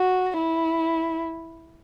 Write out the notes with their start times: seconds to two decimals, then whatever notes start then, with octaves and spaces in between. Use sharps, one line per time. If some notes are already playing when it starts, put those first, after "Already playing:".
Already playing: F#4
0.38 E4